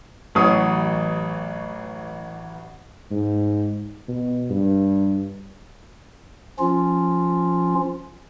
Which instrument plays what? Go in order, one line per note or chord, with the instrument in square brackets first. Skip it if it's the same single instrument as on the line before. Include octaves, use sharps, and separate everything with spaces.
[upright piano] A1 E3 F#3 C#6 D#6
[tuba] G#2
B2
G2
[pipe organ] F3 C#4 F4